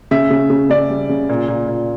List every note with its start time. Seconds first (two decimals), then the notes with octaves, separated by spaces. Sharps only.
0.11 C#3 E5
0.30 C#3
0.50 C#3
0.69 C#3 D5
0.90 G3
1.09 C#3
1.29 A#2
1.48 A#2
1.68 A#2